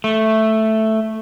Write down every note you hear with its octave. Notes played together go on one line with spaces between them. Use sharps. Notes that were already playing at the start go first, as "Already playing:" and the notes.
A3